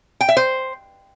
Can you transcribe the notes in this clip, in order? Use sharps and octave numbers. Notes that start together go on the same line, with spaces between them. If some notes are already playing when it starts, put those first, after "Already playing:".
G5
E5
C5